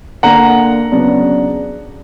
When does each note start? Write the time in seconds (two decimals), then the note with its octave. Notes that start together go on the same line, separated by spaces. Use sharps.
0.23 D3 A#3 D4 F#5 A#5
0.92 C#3 F#3 B3 D4